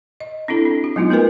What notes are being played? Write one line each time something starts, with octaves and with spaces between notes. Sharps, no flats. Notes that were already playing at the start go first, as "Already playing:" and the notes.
D#5
C4 D4 E4 A4
D4
F#4
F#3 G#3 B3 D#4 F4 F#4
A3 G#4 A#4 B4 G#5